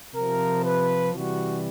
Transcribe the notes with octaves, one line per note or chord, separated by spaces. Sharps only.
C3 F3 A#4
B4
C3 E3 G3 F#4